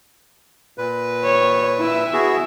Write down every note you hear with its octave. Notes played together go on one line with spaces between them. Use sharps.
A#2 B4
C#5
E4 E5
B3 F#4 G#4